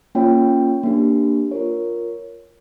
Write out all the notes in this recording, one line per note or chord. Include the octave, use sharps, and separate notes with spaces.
A#3 C#4 F4 C#5 G5
A#3 D4 G4
F4 A#4 C#5